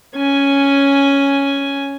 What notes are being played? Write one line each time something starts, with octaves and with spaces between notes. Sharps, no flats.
C#4 G#5